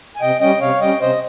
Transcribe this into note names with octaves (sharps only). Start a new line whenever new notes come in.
G#5
C3 D#5 G5
G3 C#4 D#5 G5
C3 C#5 F5
G3 C#4 D#5 G5
C3 C5 D#5